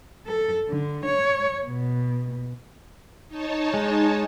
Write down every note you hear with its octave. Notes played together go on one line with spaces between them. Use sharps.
A4
D3
C#5
B2
D#4 C#5 A5
G#3